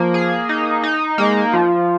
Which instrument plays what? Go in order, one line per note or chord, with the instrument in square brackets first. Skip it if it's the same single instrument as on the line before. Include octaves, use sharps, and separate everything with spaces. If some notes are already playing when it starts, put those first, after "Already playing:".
Already playing: [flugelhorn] F3 [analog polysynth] A#3
[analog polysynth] G#4
D#4
D#4
[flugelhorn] G#3 [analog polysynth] A#3
[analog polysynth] F3 [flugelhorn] F4